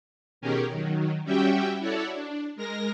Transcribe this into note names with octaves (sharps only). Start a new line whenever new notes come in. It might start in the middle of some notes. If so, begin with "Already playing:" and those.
B2 D#3 C#4 G4 G#4 A#4
D#3 F#3
G3 C#4 F#4 G4 E5 G5
E4 F#4 A4 C#5 D5
D4
G#3 A#4 A#6